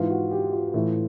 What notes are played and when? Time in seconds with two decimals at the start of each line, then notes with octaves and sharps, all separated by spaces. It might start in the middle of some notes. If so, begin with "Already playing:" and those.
Already playing: G#2 E3 F4
0.10 F#4
0.31 G4
0.53 F4
0.74 A2 E3